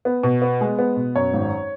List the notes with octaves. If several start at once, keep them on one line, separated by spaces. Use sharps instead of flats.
B3
B2
B3
G#3
B3
B2
F#2 C#5
G#1